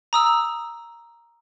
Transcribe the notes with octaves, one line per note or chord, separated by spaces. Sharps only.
A#5 D#6 E6